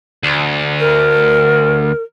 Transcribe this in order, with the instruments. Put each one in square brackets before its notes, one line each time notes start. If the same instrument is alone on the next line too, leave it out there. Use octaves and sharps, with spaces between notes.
[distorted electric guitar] D2
[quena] A#4